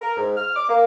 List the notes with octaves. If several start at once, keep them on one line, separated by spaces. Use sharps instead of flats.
A#4
G#2
F6
D6
A#3